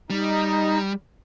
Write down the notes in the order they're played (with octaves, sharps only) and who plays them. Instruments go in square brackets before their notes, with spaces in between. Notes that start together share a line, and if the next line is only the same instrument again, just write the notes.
[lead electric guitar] G3 [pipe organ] D#4